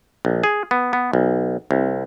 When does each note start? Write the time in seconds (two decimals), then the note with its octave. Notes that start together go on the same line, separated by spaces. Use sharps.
0.25 A#1
0.44 G#4
0.71 B3
0.93 B3
1.13 B1
1.71 C2